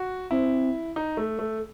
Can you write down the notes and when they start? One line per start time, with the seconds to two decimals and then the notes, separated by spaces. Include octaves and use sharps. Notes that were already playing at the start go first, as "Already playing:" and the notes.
Already playing: F#4
0.31 C4 E4
0.96 D#4
1.17 A3
1.39 A3